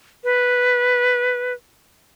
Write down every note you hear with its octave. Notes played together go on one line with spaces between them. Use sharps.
B4